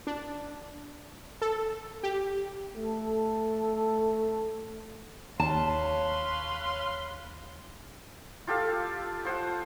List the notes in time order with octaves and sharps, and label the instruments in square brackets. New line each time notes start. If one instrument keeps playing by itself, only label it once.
[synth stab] D4
A4
G4
[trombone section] A3 A4
[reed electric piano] D#2 [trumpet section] B4 F5 C6 [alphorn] C#5 [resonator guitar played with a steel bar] A5
[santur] F4 G4 A4 F5
F3 C5 F#5